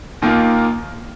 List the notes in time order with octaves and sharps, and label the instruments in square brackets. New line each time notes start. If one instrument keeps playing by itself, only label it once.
[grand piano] D#2 D#3 A#3 F4